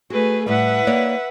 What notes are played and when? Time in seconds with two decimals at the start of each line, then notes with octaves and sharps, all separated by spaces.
0.10 A3 F#4 G#4 B4
0.46 A2 G3 B4 E5 F#5
0.87 A#3 C#5 D5